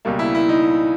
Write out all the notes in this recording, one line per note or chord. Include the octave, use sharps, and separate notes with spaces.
C#2 B2 G3 A#3
E4
E4
D#4